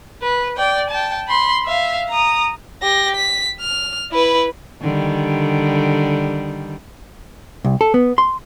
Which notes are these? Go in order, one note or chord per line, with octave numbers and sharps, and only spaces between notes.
B4
D5 G5
G5 A5
B5 C6
E5 F5
A#5 D#6
G4 A#6
B6
F6
E4 B4
D3 D#3 G3
C2
A4
B3
C6